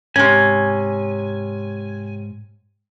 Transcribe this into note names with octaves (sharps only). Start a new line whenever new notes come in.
G#2 C3 C#4 G#5